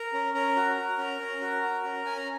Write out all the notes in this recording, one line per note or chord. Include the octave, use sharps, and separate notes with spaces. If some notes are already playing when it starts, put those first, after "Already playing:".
Already playing: A#4 A#5
C#4
C#4 A#4 A#5
F#4
F#4
C#4
C#4
F#4
F#4
C#4
C#4 G#5
A#5